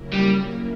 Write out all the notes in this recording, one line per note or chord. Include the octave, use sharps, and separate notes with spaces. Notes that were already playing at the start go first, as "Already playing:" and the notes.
Already playing: C#3 F#3 A#3 E4 A#4
G3